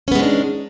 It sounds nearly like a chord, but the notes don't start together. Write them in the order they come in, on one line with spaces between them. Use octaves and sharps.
C#4 B3 G#3 D#3 D4